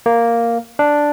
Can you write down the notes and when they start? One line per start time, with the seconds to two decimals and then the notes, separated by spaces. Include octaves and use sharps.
0.06 A#3
0.79 D4